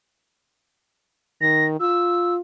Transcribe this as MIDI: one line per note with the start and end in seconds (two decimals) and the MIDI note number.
1.41 1.79 51
1.41 1.65 94
1.80 2.41 65
1.80 2.34 88